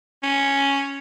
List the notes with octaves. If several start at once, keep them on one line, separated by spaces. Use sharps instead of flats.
C#4